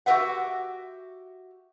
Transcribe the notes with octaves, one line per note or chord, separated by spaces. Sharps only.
F#4 G4 A4 B4 E5 F#5